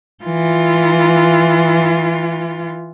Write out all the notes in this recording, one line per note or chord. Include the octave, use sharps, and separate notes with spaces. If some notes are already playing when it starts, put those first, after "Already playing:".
E3 F4